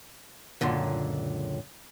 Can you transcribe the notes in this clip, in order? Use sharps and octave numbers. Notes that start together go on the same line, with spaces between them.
C#2 F#2 A#2 D3